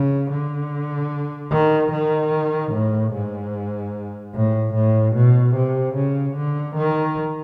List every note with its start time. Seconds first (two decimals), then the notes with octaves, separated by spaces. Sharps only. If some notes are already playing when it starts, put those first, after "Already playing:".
Already playing: C#3
0.31 D3
1.51 D#3
1.92 D#3
2.72 A2
3.13 G#2
4.34 A2
4.74 A2
5.15 B2
5.55 C3
5.95 C#3
6.36 D3
6.76 D#3